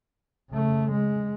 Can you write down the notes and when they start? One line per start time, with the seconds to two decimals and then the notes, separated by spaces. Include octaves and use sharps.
0.50 C#3 A3
0.91 G#3